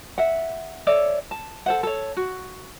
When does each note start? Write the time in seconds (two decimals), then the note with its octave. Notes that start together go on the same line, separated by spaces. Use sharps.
0.18 E5 F#5
0.87 A4 C#5 D5 E5
1.31 A5
1.66 A4 C5 F#5
1.83 A4 C#5
2.17 F#4